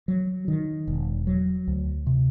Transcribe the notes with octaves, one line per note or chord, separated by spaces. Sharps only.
F#3
D#3
E1
F#3
D2
C3